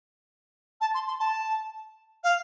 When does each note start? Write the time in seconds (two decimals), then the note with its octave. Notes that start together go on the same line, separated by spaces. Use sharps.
0.80 A5
0.94 C6
1.07 C6
1.19 A5
2.23 F5